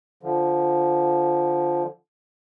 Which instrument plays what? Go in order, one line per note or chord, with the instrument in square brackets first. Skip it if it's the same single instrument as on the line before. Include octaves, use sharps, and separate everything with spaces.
[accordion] D3 F3